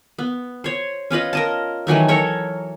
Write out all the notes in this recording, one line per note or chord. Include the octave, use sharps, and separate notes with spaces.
B3
C5 C#5
C#4 F4 B4 D#5
A#4 D#5 A5
D#3 E3 F#3 A3
A4 A#4 C#5 E5